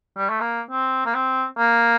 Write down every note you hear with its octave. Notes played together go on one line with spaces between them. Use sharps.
G3
A3
A#3
C4
A#3
C4
A#3